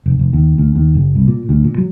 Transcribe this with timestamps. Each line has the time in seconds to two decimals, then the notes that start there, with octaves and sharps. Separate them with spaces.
0.06 F1
0.19 F1
0.33 D#2
0.58 D2
0.76 D#2
0.95 F#1
1.15 C2
1.28 A#2
1.49 D2
1.64 A#2
1.78 F#3